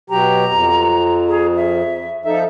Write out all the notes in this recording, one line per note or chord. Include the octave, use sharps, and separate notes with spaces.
B2 F#3 G4 A#5
F2
G#4
E5
F3 D#4 A4 E5